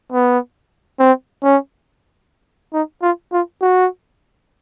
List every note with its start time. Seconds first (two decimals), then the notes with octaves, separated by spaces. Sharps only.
0.12 B3
0.99 C4
1.44 C#4
2.73 D#4
3.02 F4
3.32 F4
3.61 F#4